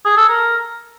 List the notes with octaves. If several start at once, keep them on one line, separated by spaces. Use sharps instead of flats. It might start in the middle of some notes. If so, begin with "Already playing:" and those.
G#4
A4
A#4